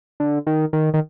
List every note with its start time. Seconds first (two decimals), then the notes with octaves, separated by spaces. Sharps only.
0.20 D3
0.47 D#3
0.73 D#3
0.94 D#3